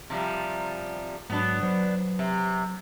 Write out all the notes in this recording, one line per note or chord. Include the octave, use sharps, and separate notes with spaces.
C3 F3 G3
G#2 F#3 B3 D4
F#3 B4 C5
C3